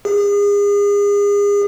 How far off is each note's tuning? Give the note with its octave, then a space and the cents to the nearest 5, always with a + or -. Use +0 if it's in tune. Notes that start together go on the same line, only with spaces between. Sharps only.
G#4 -35